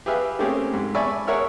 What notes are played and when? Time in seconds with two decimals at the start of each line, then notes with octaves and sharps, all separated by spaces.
0.06 G4 G#4 B4 E5 F5
0.39 A3 A#3 C4 C#4 G4 G#4
0.74 G#2
0.95 D5 E5 G#5 A5 B5 C#6
1.27 G#4 A#4 C#5 E5 F#5 F6